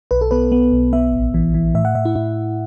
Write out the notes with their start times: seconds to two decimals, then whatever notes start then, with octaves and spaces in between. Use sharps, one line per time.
0.11 B1 B4
0.21 A4
0.31 B3 B4
0.52 B3
0.72 B1
0.93 B3 E5
1.13 A1
1.34 E3
1.54 E3
1.74 A2 E5
1.85 F#5
1.95 A2 E5
2.05 E4
2.16 A2 E4